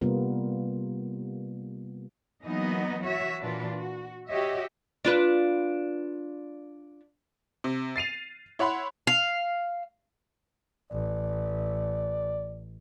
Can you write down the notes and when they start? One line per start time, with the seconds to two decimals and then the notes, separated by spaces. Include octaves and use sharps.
0.01 C3 G3 A#3 B3 F4 A#4
2.44 E3 F#3 A#3 B3 D#4 D#5
3.01 E3 F#4 C#5 E5
3.40 A#2 E3 D4 F4 F#4 B4
3.73 F#4
4.28 F#4 G4 C#5 D#5 E5
5.05 D4 F4 B4
7.64 C3
7.96 A6 C7 D#7 F7
8.59 E4 C#5 F#5 B5 C6
9.07 F5
10.91 A1 D5